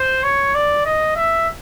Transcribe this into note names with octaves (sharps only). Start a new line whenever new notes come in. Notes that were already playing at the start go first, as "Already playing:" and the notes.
Already playing: C5
C#5
D5
D#5
E5